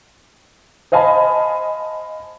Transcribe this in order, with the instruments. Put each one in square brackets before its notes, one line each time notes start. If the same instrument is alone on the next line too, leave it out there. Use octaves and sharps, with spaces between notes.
[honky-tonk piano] C5 D#5 F5 G#5 A5 B5